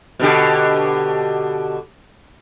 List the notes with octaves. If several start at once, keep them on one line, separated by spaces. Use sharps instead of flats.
B2 D3 G4